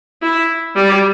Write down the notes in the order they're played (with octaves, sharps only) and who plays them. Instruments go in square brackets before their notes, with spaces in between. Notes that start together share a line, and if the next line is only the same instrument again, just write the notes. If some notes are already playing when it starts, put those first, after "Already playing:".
[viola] E4
G3